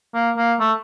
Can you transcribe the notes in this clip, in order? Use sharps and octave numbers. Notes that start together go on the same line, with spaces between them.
A#3
A#3
A3